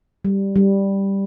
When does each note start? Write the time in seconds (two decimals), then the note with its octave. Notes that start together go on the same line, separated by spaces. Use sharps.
0.25 G3
0.56 G3